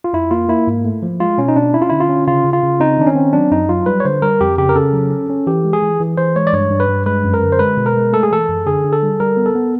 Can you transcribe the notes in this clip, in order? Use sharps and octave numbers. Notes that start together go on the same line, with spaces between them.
F4
F2 E4
A#3 F4
A#3 E4
G#2
A3
F3
G#3 F4
B2 C#4
D#4
B2 D4
C#4 E4
F4
D3 E4
F4
C#4
C#3 F4
C#3
F4
C#3
C4 D#4
D#3 D4
C#4
C4
F#3 D4
F#2 D#4
F#3 F4
G3 B4
C#5
D3 C5
G3 A#4
F2 G4
C#3 G4
A#4
C#3 A4
F#3
C#4
C#4
E3 G4
G#3
G#4
E3
E3
E3 C5
G#3 C#5
D5
G2 C#5
G2
B4
G2
G#3 B4
F#2
A#4
D3
C5
G#3 B4
B2
A#4
G#3
A3 A4
G#4
E3 A4
F#2
D3 G#4
D3
A4
G3
G3 A#4
B3
A4
B3